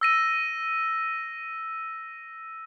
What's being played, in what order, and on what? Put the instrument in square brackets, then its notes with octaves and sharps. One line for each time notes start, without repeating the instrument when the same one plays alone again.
[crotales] E6 A#6 D#7